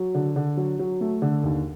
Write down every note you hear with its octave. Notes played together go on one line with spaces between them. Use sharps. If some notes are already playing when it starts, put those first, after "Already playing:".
Already playing: F#3
D3
D3
F#3
F#3
A3
D3
D#2